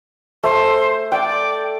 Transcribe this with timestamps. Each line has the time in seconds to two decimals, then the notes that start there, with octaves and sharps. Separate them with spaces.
0.44 A3 C5
1.12 D5 G5